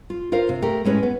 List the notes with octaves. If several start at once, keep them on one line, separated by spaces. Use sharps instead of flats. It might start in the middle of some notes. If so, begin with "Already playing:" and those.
F4
F4 A#4 C5 F5
C3
A3 G4 A#4
A2 G#3 C#4 B4
B3